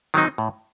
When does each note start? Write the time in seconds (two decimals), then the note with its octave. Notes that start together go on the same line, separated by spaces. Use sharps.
0.14 D#3 F#3 C4 D#4
0.38 A2